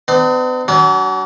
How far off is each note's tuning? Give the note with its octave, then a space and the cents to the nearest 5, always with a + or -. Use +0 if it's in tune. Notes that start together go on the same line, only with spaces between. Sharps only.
B3 +45 D4 +45
F#3 +25 D4 -45